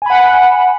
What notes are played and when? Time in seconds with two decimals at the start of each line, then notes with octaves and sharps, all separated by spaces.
0.02 G#5
0.06 B5
0.10 F#5